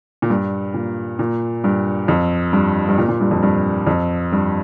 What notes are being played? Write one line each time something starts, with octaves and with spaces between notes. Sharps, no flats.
A#2
G2
A#2
A#2
G2
F2
G2
G2
A#2
A#2
G2
F2
G2
F2
G2